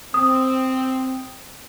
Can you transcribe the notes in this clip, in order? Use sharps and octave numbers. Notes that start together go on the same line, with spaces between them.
C4 D#6